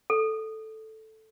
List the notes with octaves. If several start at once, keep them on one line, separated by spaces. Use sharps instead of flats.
A4